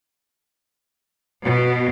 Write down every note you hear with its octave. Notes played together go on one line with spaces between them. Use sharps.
B2